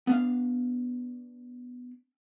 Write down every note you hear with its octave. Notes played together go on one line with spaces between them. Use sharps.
B3 D4 F5